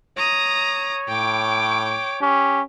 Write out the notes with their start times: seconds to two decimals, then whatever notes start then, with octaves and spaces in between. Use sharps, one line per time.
0.18 C#5 A#5 D#6
1.08 A2 G5 D6
2.21 C#4 G4